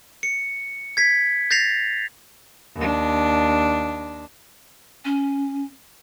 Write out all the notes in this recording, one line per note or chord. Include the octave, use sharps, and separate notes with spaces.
C#7
G#6 B6
G6 A6 A#6 C7 F7
D#2 D4
C#4